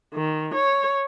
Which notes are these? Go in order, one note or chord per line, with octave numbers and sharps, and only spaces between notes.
D#3
C#5